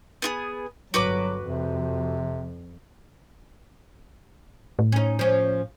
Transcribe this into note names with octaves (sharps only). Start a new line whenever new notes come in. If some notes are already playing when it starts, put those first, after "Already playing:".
B3 F4 G#4
G1 F#3 F#4 B4 D6
F2 C3
A2
C#4 D#4
F3 C#4